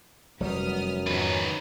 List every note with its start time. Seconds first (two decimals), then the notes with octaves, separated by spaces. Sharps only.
0.40 F1 F#2 F#3 G3 B3 D#6 F6
1.07 F2 G#2 D#3 B3 C#4 B4 A#5